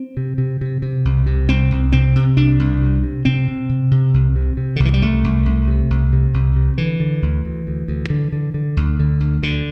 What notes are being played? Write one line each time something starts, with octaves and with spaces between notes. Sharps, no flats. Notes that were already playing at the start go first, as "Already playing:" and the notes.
Already playing: C4
C3
C3
C3
C3
C2
C3
C2 C4
C2
C3 C4
C3
C2 D4
C2
C3
C3
C3 C4
C3
C3
C3
C2
C3
C3
D3
C2
E3
G3
C2 A3
C2
C2
C3
C2
C3
C2
C3
D3 E3
D3
D2
D2
D2
D2
D3
D3
D3
D2
D3
D2
D2 D3